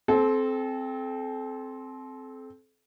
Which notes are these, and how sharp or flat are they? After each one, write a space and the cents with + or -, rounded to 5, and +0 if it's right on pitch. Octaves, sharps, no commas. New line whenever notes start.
C4 +0 A4 -35